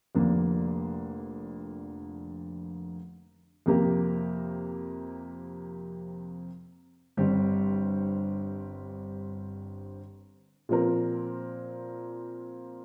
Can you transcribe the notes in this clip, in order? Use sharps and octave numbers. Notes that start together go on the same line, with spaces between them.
F1 F2 D3 A#3 D4
F2 C3 A#3 G4 A#4
G1 G2 G3 C4 G4
A#2 F3 C4 A#4